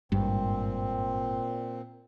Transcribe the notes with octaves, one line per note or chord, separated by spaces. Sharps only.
G#1 G2 A#2 C4